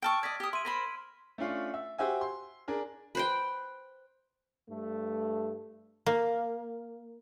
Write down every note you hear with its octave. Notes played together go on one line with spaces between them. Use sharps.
G5 A5 C#6 E6 F6 D7
D5 D#5 G#6 B6
G4 D#6
E5 C6 D#7
A#4 C5 B5 B6
A3 C#4 D4 F4
E5
F#4 G4 C5 E5 G#5
C6
D4 G#4 A#4
B4 C5 G5
G2 A3
A#3